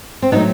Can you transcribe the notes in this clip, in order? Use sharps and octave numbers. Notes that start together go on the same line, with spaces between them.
C4
A2 F#3 A3 B3 D#4